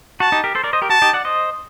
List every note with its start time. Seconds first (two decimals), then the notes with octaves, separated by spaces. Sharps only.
0.20 F#4 A5
0.32 D#4 G4
0.44 G4 A#4
0.55 A4 C5
0.64 A#4 D5
0.73 C5 D#5
0.82 G4 A#4
0.89 F#4 A5
1.02 D#4 G4
1.13 D5 F#5
1.25 C5 D#5